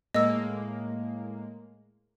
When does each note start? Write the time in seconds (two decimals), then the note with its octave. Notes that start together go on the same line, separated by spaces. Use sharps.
0.14 A2 G#3 A#3 D#5 E6